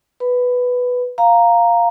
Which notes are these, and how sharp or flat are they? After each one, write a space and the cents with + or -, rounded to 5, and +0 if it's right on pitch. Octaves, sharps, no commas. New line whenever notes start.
B4 +0 B5 +15
F5 +0 A#5 +0